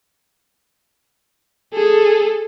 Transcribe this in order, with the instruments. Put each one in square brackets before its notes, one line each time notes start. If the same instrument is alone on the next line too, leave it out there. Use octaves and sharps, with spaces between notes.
[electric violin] G#4 A4